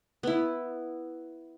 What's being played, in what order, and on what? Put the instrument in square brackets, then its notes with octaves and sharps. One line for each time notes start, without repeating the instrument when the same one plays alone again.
[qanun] B3 E4